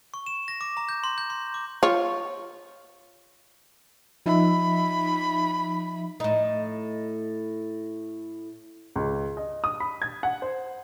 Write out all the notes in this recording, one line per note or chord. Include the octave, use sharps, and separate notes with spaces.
C#6
E7
A#6
D6
A#5
G6
C6
G6
C6
D6
F4 C#5
F3 D#4 E5 B5
A2 D#4
C#2
D#5
D#6
B5
G#6
F#5
C5